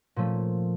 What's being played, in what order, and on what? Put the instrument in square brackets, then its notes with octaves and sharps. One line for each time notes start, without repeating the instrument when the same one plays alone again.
[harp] A#2 F3 A3 C#4